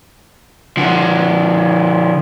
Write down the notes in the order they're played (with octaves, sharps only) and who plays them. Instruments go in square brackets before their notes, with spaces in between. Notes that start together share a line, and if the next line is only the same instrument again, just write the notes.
[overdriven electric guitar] D3 F3